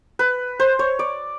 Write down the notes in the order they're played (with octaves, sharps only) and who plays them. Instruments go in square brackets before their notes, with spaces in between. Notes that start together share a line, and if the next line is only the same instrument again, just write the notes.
[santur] B4
C5
C#5
D5